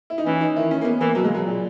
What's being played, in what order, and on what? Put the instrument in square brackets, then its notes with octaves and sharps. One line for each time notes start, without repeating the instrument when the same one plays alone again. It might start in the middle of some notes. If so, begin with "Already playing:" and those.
[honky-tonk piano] E4
D#4
[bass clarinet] E3 [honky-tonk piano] C#4
[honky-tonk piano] D#4
[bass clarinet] D#3 [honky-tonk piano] E4
[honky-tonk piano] C#4
A#3
B3
[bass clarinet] E3 [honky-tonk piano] A#3
[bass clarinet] B2 [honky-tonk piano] F#3
[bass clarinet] C#3 [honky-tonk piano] G#3
[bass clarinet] B2 [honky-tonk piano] F#3
[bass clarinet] A#2